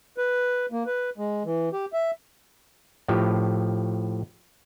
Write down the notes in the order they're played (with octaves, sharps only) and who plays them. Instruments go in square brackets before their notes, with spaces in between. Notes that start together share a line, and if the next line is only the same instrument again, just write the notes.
[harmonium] B4
A#3
B4
G#3
E3
G4
E5
[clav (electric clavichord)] A2 F3 G4